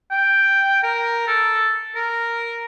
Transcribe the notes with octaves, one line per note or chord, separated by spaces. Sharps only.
G5
A#4
A4
A#4